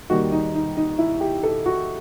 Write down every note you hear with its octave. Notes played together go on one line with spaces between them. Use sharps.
D#2 D#3 G3 F#4
D#4
D#4
D#4
E4
G4
A4
F#4